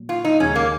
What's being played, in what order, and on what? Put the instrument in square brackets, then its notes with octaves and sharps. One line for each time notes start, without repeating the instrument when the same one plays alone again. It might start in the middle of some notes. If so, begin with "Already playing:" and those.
Already playing: [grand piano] A#2 F#3
[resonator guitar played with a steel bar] F4
D#4
[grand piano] D#2 C#3 G#3 [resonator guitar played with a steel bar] C#4
[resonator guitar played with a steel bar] A#3